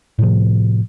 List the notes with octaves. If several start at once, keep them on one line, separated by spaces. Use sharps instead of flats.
A2 C3 F3